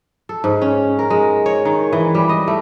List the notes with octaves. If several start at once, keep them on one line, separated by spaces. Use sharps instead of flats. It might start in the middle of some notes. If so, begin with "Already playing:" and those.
A4
G#2
C#4
A#4
G#3
C#5
D#3
E3
G3
D#5
A3